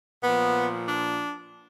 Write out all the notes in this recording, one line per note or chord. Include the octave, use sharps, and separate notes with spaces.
A#2 F3 B3
D4